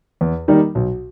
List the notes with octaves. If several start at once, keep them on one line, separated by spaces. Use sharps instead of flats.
E2
D#3 G3 A#3 D#4
B1